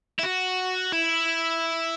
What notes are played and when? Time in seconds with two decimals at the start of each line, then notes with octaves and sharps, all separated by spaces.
0.19 E4
0.24 F#4
0.93 E4